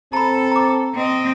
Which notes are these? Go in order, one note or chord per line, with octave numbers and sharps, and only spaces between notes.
C4 A4 A#5 B5
A#5 D6
C4 D#5